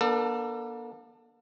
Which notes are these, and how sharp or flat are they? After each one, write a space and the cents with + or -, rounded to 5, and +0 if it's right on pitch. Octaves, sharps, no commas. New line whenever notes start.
A#3 +45 D4 +0 A4 +30